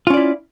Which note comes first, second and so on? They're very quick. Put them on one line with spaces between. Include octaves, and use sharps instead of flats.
F4 C#4 D5 E4